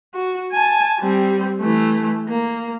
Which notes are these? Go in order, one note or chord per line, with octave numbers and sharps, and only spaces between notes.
F#4
G#5 A5
G3 C4
E3 A3
A#3